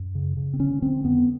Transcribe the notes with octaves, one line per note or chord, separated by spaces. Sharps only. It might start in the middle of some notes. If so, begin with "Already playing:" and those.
Already playing: F#2
C#3
C#3
C4
D3 C#4
D3 C4
F2 B3